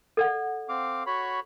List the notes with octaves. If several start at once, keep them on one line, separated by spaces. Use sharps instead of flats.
A4 D5 F#5
C4 F5 D6
F#4 C#5 B5